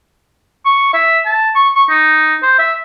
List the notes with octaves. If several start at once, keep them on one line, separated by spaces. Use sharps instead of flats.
C#6
E5
A5
C#6
C#6
D#4
C5
E5